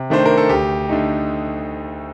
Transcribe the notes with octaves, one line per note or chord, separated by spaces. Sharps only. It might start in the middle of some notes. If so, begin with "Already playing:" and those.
Already playing: C3
D#3 A3 D4 C5
A#4
A4
D2 G4
D3 A3 D#4